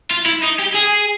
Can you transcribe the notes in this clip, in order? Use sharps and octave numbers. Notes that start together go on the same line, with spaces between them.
F4
E4
D#4
G4
G#4